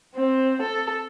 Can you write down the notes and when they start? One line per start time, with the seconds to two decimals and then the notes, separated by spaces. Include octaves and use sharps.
0.15 C4
0.62 A4